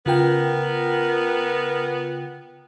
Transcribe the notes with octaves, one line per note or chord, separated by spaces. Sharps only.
C#3 B3 F4 A#4 G5